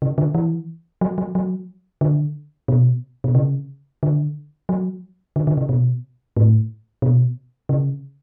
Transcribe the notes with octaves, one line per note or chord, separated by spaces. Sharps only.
C#3
D3
E3
F#3
F#3
F#3
D3
B2
B2
C#3
D3
F#3
D3
D3
C#3
B2
A2
B2
C#3